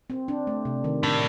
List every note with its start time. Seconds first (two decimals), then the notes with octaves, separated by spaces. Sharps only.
0.10 C4
0.28 D4
0.47 A3
0.65 C3
0.84 D#3
1.03 A2 D4